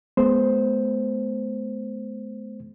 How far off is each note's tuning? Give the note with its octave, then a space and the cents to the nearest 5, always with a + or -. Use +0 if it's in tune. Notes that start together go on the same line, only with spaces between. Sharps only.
G#3 +45 B3 +0 C5 +0